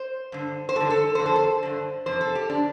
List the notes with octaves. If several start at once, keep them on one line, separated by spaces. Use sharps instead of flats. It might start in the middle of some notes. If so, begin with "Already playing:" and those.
Already playing: C5
G2 D3
C5
G2 D3 A4
A4
F2 D3 C5
A4
C5
G2 D3
F2 C3 C5
A4
G4
D3 D4